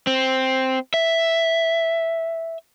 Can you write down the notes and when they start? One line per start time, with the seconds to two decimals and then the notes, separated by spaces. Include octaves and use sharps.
0.07 C4
0.94 E5